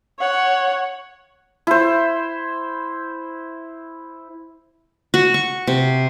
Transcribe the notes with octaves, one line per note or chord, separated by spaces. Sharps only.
C#5 F#5
E4 C5
F#4
C#6
C3